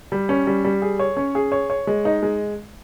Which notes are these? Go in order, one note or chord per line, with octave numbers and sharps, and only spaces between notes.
G3
C#4
G3
G3
G#4
C#5
C#4
G#4
C#5
C#5
G#3
D#4
G#3